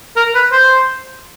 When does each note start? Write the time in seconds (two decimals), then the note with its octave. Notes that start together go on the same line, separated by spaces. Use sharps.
0.17 A#4
0.35 B4
0.53 C5